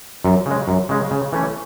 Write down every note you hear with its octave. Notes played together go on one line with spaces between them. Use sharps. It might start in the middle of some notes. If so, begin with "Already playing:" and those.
F#2
C#3 G#3
F#2
C#3 G#3
C#3
E3 A3 C#4